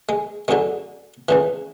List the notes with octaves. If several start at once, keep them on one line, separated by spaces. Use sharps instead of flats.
G#3
F#2 D3 F#3 G#3
C#2 C#3 E3